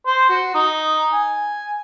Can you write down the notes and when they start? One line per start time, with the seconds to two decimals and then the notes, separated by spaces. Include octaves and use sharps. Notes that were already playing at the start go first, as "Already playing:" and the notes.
0.06 C5
0.29 F#4
0.54 D#4
1.13 G#5